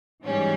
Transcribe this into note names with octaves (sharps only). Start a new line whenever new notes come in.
G#2 E3 G3 C#4